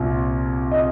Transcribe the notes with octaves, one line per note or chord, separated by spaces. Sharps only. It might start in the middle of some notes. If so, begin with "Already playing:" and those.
Already playing: C2 A#2
D#5